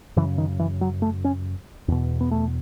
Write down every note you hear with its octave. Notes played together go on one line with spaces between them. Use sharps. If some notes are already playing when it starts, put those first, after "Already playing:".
F#2 C#3 E3
D#3
E3
F#3
A3
C#4
E2 B2
B3
A3